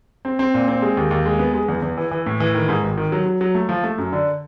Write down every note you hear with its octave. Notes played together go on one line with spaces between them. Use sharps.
C4
C4
A#2
C4
G#3
D#2
D#2
G#3
B3
G#3
E2
E2
E3
E3
A2
E3
D#3
G#2
G#1
D#3
F#3
F#3
F#3
A3
F3
A3
F#2
D3